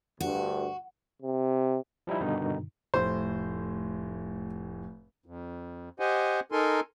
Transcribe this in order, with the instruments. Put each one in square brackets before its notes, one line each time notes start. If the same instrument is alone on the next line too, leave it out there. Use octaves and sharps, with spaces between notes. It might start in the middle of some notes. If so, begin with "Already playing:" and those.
[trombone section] D2 G2 [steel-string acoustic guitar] F#4
[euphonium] C3
[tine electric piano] F3 G3 D#4 E4
G2 B2 D3 D#3 D#4
[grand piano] F1 A2 [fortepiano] C5
[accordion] F2
G4 C5 D#5 F#5 G#5
D#4 A4 A#4 G#5 C6